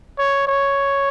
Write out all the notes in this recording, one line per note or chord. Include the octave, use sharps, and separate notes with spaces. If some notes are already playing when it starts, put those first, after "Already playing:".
C#5
C#5